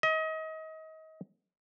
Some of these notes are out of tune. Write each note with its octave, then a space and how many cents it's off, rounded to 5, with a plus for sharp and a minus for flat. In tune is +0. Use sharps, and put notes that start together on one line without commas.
D#5 +30